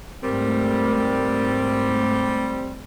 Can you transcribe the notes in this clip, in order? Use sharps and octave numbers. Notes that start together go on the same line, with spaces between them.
G#2 G3 A3 C4 A#4